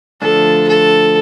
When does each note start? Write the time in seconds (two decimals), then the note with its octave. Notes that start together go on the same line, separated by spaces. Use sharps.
0.22 D3 F3 A3 D4 A4
0.68 A4